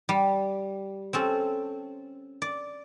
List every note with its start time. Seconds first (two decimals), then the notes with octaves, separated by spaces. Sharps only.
0.09 G3
1.13 C4 C#4 A4
2.42 D5